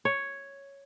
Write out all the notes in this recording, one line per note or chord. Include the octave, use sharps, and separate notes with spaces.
C#5